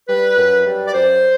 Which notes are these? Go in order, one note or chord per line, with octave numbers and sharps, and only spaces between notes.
G3 B4
F#2
G3
D5
F#2 C5